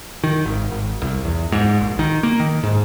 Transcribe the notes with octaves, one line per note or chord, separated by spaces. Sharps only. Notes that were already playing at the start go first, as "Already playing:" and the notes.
D#3
G#1
G#1
C2
E2
G#2
A#1
D#3
A#3
D#3
G#2